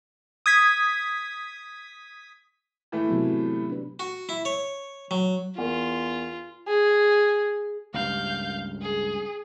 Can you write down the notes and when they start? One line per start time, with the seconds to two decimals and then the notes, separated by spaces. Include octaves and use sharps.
0.46 D#6 G#6 B6
2.92 A2 E3 A3
3.09 C3 F#3 B3
3.70 D4 B4
3.99 F#4
4.29 E4
4.45 C#5
5.11 F#3
5.58 E2 F4 A#4
6.68 G#4
7.94 C#2 G2 F5 G6
8.82 G#4